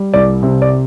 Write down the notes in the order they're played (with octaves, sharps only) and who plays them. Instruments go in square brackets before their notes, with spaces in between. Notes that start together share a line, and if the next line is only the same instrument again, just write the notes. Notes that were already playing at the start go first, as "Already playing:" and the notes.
Already playing: [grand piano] G3
C2 D5
C3
D5